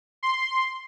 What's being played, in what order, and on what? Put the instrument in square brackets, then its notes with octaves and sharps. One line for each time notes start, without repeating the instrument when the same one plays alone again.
[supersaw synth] C6